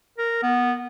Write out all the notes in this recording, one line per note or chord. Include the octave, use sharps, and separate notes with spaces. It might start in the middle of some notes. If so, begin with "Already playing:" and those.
A#4
B3